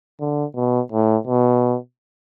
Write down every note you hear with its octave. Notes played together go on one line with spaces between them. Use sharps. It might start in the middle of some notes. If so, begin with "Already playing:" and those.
D3
B2
A2
B2